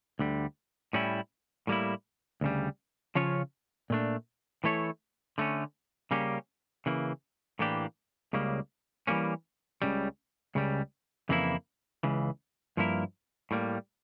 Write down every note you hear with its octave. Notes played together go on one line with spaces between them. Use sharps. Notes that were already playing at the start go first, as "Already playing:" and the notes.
D2 D3 G3
A2 G3 C#4 E4
A2 G3 A#3 E4
D2 C#3 G3
C#3 F3 C#4 F4 C#5
A#2 A3 D4
E3 A3 E4 A4 C#5
D3 A3 C#4
C#3 G3 A#3 C#4 G4
C#3 E3 A#3
A2 E3 A#3 D4 G4
C#2 C#3 G3 A#3
E3 G3 A#3 C#4
C#2 C#3 G3
C#2 C#3 G3
F2 C#3 E3 A#3 E4
C#2 C#3 E3
G2 F3 A#3 E4 A#4
A2 G3 A#3